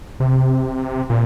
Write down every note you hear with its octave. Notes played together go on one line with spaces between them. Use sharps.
C3
A#2